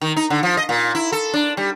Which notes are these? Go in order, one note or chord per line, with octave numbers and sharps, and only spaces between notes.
D#3
D#4
D3
F3
D#5
A#2
E4
A4
D4
G3